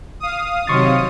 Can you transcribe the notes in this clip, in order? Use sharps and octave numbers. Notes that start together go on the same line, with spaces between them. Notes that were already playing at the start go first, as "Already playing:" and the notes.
F5 D#6
C3 D#3 F#3 C#5 C6 C#6 A6